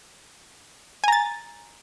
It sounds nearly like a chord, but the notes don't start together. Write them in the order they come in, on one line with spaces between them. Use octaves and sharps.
G#5 A#5 A6